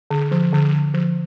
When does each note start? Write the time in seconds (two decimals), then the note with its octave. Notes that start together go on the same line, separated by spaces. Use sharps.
0.11 D3
0.31 F3
0.53 D3
0.73 D3
0.94 F3